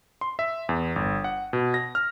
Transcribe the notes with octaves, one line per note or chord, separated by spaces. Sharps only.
C6
E5
E2
G1
F#5
B2
A#6
F6